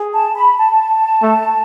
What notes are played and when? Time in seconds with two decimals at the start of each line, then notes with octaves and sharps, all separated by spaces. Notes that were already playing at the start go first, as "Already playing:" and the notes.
Already playing: G#4
0.13 A5
0.35 B5
0.57 A5
1.22 A3